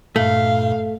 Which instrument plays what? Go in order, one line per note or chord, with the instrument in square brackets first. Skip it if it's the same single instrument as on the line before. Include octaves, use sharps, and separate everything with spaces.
[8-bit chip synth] G2 A#2 [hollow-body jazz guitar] A3 [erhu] F5